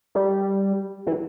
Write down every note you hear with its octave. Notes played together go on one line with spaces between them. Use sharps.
G3
E3